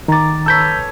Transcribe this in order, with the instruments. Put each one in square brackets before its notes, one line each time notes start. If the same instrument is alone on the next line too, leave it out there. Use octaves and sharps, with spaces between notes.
[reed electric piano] D#3 A6 [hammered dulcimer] A#5 D6
[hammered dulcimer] A4 B4 C#5 [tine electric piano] E6 G6 B6